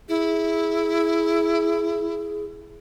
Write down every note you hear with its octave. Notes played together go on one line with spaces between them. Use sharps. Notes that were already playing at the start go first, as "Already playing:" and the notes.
E4 G#4